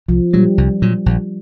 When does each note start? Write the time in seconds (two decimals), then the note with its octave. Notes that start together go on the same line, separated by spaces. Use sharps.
0.09 C2 F3
0.33 A#2 F#3 G3
0.58 C2
0.82 A#2 F#3
1.06 A#1